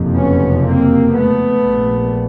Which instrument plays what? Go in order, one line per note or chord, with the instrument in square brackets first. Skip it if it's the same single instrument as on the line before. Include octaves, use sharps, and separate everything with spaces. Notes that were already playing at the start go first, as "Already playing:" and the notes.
Already playing: [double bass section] F#1 F2 C3
B3 C#4
A#3 C4
A3 B3
A#1 A#2